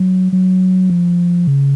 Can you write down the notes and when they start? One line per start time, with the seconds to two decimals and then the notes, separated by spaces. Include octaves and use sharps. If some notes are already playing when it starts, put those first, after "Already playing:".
Already playing: F#3
0.32 F#3
0.90 F3
1.47 C#3